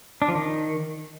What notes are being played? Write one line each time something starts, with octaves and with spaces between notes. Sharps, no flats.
D4
F3
D#3